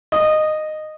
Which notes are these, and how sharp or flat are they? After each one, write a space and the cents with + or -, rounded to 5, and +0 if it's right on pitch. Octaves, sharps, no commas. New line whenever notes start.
D#5 -15